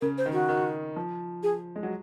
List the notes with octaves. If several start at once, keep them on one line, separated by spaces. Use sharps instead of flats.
C#3 A#4
C5
D#3
F#4
D#3
F3
G#4
G#3
F#3